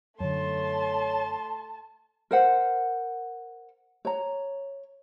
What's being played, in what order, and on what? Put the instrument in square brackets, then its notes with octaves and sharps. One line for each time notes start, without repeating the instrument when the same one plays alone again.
[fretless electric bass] F#2 D3 [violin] A3 C6 [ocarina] C#5 [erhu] A5
[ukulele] A#4 C5 F#5
C#5 A#5